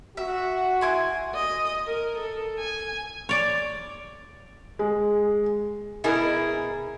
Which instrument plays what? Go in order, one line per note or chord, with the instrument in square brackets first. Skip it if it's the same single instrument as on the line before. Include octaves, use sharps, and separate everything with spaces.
[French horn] F#4 [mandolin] E5
[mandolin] E4 G#5 C6
[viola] D#5
A#4
A4
G#5
[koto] C#5 D5
[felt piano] G#3
[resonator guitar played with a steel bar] B2 E4 G#4 A#4